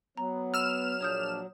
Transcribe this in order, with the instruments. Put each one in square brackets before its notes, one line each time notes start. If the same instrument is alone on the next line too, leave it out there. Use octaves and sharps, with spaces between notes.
[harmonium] F#3 [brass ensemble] B3 [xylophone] A#5
[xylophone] E6 [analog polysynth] F6 E7
[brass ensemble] A#1 D4 [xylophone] C#5 D#6 G6